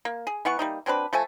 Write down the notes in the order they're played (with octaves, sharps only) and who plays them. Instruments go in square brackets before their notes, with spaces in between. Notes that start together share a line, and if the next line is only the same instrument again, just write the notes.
[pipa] A#3
G#4
E3 B3 F#5 C#6
G3 A#3 D#4
F#3 C4 D4 B4
F3 A3 A4 G#5